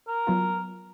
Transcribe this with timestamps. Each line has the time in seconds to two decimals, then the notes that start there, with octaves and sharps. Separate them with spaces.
0.08 A#4
0.27 F#3 B3 F4